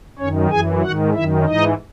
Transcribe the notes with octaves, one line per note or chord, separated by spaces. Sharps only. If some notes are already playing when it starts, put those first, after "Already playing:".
F#2 D#3 C#4 C#5
F#2 E3 G#4 G#5
G#2 D#3 F#4 F#5
F#2 D#3 E4 E5
G#2 E3 D#4 D#5